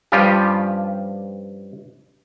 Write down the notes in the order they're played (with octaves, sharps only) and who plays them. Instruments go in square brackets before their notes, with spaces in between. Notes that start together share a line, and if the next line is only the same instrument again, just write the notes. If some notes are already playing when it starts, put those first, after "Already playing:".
[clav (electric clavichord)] G2 F3 G3 C#4 F4 G4